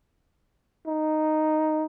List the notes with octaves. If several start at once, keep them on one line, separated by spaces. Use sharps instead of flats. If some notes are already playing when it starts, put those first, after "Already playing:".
D#4